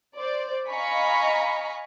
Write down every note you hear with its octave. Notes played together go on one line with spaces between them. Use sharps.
C5 D5
D#5 F5 G#5 A#5 B5 C#6